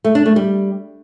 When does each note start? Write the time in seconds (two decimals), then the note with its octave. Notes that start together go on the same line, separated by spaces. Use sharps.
0.05 A3
0.15 D4
0.26 A3
0.36 G3